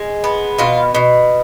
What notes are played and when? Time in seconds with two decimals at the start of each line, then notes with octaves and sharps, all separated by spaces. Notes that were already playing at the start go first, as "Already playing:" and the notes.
Already playing: G#3
0.24 B3
0.59 B2 F4
0.95 B2